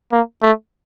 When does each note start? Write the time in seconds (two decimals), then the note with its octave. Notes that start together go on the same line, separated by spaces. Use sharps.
0.12 A#3
0.42 A3